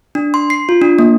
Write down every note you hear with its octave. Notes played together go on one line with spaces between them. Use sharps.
D4
C6
C7
F4
D4
A#3